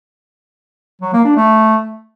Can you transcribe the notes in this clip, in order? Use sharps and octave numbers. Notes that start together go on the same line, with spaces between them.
F#3
A#3
D4
A3